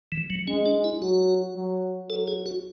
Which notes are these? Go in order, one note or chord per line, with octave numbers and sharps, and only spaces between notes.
E3
F#3
G#3 C#4
D4
E4
F#3 F#4
F#3
F#3 A4
G#4
F#4